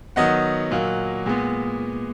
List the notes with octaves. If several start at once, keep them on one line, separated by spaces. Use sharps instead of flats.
D#3 F#3 B3 D#5 F#5
A#2 F#3 A#3
A#2 G#3 B3